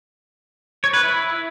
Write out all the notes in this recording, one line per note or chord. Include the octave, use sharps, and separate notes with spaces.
C#5
B4
E4